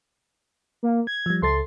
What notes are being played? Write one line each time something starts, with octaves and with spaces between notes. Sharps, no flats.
A#3
G#6
F3 G3
C#2 A4 C6 A6